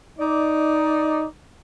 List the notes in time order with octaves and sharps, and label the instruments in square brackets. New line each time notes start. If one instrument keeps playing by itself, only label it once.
[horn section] D#4 D5